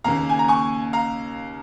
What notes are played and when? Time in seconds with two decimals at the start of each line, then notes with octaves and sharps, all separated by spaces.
0.04 D#2 C#3 A#3 F5 A#5
0.29 G#5
0.39 A#5
0.48 G#5 C#6
0.93 F5 A#5